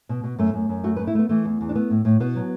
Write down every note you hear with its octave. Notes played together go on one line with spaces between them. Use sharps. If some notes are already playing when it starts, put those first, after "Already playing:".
B2
B2
F#2 A3
F#2
F#2
A3 F#4
B4
A3
E4
A3 B3
E3 A3
E2
E2
D4
A3 B3
A2
A2
B2 B3
F#3